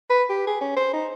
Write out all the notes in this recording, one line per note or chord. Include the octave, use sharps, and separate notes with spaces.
B4
G4
G#4
C#4
C5
D#4